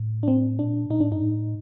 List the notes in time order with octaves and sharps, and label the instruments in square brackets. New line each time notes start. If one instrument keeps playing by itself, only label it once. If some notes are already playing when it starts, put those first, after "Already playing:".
Already playing: [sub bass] A2
[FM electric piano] D4
C4
[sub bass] A#2 [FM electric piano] D4
[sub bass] A#2 [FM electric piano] D#4
[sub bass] A2 [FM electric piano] D4
[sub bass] G2 [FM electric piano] D#4
[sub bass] A2